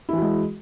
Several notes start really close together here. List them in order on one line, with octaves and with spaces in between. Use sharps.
E4 E3 F#4 G#3